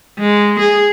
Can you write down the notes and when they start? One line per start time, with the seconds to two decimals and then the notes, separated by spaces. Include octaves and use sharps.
0.20 G#3
0.60 G#4